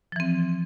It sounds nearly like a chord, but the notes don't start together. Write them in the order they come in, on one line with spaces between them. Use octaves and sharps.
F3 E3 C4